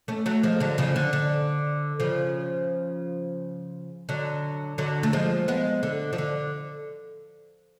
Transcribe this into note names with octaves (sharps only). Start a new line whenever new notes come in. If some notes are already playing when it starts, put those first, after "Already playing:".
A3 C#4
F#3 A3
F3 G#3
D3 F#3
C#3 F3
D3
D3
C#3 F3
D3 F#3
D3 F#3
A3
F3 G#3
G#3 B3
D3
F3
D3